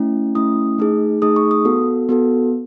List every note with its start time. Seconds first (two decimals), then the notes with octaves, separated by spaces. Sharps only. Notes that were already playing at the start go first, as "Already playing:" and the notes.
Already playing: A3 C#4 E4
0.35 A3 C#4 E4 D#6
0.78 A3 D#4 G#4
1.22 A3 D#4 G#4 D#6
1.36 C#6
1.51 D#6
1.65 B3 F#4 A4
2.09 B3 F#4 A4